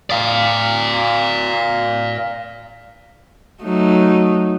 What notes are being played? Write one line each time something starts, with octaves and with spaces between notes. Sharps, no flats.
D5 F5
F#3 A3 D#4